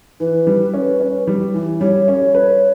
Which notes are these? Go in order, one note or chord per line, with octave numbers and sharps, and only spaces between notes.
E3 B4
G3
C#4
C#4
G3
E3
G3 C#5
C#4
B4